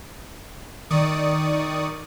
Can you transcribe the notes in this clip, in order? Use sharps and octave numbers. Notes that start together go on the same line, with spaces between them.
D#3 D5 C#6 D#6